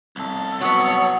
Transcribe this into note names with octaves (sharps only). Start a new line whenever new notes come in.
C2 A4
F#3 B3 C#5 F#5 D#6